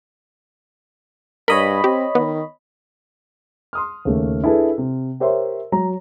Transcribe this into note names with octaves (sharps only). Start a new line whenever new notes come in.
G2 A#4 C#5 D#5 B5
C4 G4
D#3 B3
C6 D#6 F6
D#2 C#3 A3
D4 E4 G#4 A4 B4
C3
G4 A#4 C5 C#5 E5 C6
F#3 A#5